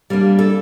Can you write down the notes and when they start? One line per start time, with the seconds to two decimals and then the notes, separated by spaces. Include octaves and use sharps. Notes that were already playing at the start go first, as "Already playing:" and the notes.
0.10 G3 A#3 D4
0.39 A4